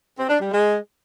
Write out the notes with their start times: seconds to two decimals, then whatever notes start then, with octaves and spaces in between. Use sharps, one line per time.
0.18 C4
0.29 D4
0.40 G3
0.52 G#3